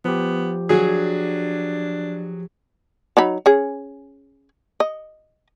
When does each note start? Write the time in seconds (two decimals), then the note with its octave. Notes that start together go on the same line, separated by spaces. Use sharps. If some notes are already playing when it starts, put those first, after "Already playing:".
0.05 F3 B3 G4
0.69 F#3 D4 G#4
3.17 F#3 D#4 B5
3.46 C#4 G#4
4.80 D#5